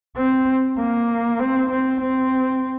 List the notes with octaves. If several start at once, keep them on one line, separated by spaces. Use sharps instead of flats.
C4
A#3
C4
C4
C4